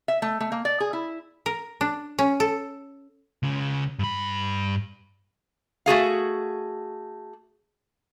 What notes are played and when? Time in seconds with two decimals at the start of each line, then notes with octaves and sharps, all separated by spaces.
0.08 E5
0.22 A3
0.40 A3
0.52 A#3
0.65 D5
0.80 G#4
0.93 E4
1.46 A#4
1.81 D4
2.19 C#4
2.40 A4
3.43 C#2 C#3
3.99 G2 B5
5.86 A3 F#4 G#4 F5